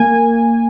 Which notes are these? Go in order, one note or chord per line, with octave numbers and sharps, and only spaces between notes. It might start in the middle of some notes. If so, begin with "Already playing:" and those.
Already playing: A#3 G#5